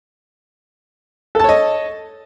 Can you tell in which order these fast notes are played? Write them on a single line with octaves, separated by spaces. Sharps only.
A4 A5 C#5 D#5